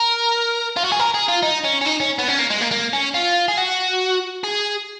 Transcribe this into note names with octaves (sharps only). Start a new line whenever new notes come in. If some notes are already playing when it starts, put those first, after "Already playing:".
Already playing: A#4
F4
F#4
G#4
A#4
G#4
F4
D#4
C#4
C#4
D#4
C#4
B3
C#4
A#3
G#3
A#3
A#3
C#4
F4
G#4
F#4
G#4